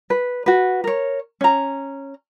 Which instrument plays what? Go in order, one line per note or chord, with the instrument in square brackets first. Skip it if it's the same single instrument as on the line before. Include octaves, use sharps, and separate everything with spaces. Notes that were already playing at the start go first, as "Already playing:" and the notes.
[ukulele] B4
F#4 B4
A#4 C#5
C#4 A#5